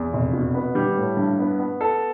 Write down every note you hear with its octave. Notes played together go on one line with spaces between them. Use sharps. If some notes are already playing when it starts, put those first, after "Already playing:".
Already playing: E2
F1
B2
B3
G3
A2
G2
B3
B3
A4